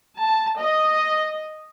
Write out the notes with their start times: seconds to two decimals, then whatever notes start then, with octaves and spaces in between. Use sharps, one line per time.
0.18 A5
0.58 D#5